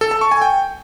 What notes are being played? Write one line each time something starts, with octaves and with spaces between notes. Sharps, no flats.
A4
A5
C#6
G#5
G5